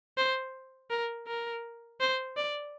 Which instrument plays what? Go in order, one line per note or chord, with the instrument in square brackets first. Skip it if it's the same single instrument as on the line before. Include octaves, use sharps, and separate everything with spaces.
[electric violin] C5
A#4
A#4
C5
D5